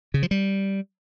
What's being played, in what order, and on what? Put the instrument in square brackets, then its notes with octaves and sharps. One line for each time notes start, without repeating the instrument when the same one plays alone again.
[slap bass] C#3
F3
G3